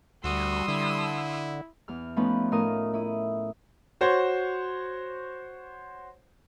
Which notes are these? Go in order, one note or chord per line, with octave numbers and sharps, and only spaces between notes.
D2 G3 F#4 C6 D#6 E6
D3 E4
E2 F6
F3 A3 B3 C#4 D#4 B4
A2 D#4 F4 A#4 D#6
E4 D#6
F#4 C5 C#5